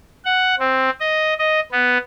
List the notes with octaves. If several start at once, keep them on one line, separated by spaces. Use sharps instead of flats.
F#5
C4
D#5
D#5
B3